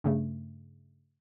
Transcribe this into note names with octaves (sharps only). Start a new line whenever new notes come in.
G2 C#3 A3